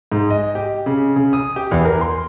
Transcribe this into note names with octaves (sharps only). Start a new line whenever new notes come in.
G#2
D#5
G4
C#3
C#3
D#6
G4
E2
A#4
C6